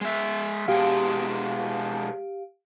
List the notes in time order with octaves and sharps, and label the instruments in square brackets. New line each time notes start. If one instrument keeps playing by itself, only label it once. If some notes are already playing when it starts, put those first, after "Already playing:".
[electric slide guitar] G#3 E5
[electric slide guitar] B2 G#3 D4 [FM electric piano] G4 F5